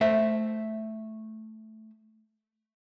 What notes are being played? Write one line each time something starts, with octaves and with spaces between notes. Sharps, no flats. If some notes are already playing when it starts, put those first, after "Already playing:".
A3 C5 E5